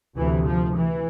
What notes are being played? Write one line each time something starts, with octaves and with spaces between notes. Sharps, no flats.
D2 C3 E3
F3
E3